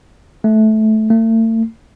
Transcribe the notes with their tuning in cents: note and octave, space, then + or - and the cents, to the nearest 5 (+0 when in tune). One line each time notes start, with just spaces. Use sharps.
A3 -15
A3 +40